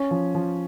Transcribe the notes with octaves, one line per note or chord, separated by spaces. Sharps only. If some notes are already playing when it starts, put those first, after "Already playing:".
Already playing: C#4
F3
F3